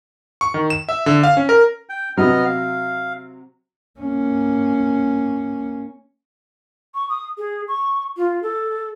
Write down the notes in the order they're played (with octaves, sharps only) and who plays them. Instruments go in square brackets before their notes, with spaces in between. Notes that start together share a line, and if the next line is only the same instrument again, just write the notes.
[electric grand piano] C#6
D#3
E7
E5
D3
F5
C#4
A#4
[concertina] G5
[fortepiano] C3 F#3 [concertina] B3 D#5 F6
[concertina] F5
[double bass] A#3 C#4
[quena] C#6
D#6
G#4
C#6
F4
A4